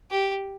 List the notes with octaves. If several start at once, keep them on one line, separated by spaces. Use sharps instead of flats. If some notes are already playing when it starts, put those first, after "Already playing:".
G4